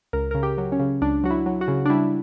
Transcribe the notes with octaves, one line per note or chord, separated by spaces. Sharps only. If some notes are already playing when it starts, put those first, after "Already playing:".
C#2 A#4
C#3 A#4
G4
F#3
C#4
C#3
C#2 D4
F#3 F#4
E4
F#3
F#4
C#3
D4
G3 E4